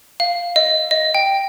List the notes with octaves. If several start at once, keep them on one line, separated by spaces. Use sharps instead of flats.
F5
D#5
D#5
G5